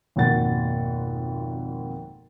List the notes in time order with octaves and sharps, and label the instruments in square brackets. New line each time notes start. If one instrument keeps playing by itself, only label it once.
[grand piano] G#1 F2 B2 A#3 F#5 A6